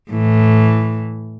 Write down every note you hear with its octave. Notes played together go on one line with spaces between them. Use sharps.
A2 E3